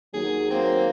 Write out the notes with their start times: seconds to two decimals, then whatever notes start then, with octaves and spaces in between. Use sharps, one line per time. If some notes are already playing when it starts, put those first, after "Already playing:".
0.14 D#2 F#3 G#4
0.51 A#3 C4